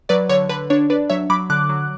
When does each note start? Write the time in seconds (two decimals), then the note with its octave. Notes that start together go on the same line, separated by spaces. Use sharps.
0.09 F#3 B4 D5
0.29 D3 C#5
0.49 D3 B4
0.70 D4 C#5
0.90 D4 B4 D5
1.09 F#3 C#5 E5
1.30 F#3 B5 D6
1.50 D3 D6 F#6
1.69 F#3